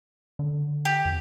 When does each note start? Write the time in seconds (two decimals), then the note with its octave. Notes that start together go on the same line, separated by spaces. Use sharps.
0.39 D3
0.85 G4
1.05 F2